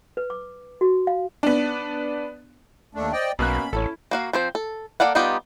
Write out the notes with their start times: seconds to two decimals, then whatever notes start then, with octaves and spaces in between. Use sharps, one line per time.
0.17 B4
0.30 D6
0.81 F#4
1.07 F5
1.43 B3 D4
2.95 D#2 A3 D4 A4
3.13 C5 D5 D#5 G5
3.39 B1 B2 A#3 C#4 B5 F#6
3.73 A1 C#4 E4 A4
4.11 A#3 F#4 F5
4.33 F3 C4 C5
4.55 A4
5.00 A#3 A4 D5 F5 F#5
5.15 G3 B3 D#4 F4 G4